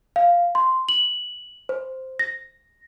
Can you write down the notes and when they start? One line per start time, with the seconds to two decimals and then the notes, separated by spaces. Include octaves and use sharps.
0.16 F5
0.55 C6
0.89 F#7
1.69 C5
2.19 A#6